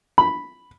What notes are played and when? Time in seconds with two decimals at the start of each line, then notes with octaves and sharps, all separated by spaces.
0.18 B5